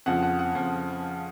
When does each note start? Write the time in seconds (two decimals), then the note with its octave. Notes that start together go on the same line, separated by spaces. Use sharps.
0.06 F2 C#3 F3 F#5
0.23 F#5
0.39 F#5
0.55 F2 C#3 F3